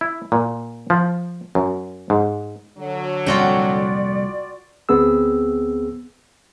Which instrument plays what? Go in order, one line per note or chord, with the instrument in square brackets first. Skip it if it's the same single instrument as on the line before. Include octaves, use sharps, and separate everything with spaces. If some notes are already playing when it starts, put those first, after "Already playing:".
[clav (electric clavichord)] E4
A#2
F3
F#2
G#2
[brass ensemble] D3 F#3
[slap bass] C2 F2 A#2 [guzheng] F4 F#4 G5 [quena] D5
[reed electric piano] D2 B3 C4 G#4 E6